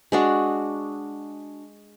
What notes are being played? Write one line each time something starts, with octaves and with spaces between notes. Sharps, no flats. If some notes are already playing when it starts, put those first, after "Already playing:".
G#3 D4 F#4